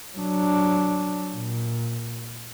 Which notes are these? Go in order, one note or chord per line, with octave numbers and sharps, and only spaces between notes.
F#3 D4
A#2